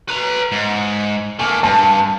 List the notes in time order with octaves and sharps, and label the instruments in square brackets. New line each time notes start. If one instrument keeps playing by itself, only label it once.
[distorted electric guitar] B4 A#5
G#2
[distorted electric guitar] A3 A#3 [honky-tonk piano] G#5
[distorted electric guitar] G2 [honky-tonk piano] A5